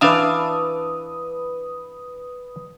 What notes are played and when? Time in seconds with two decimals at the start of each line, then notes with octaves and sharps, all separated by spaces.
0.01 E3 D4 B4 E5 F5 A5 D#6